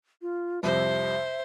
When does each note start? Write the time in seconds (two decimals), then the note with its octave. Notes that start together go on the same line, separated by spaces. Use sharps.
0.22 F4
0.63 C2 F2 C3 C5 E5